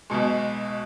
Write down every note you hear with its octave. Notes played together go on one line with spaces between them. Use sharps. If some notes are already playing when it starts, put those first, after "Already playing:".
B1 B2 G#3